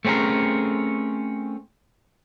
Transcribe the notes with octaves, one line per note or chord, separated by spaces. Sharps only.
A3 C4 C#4 G#4 A#4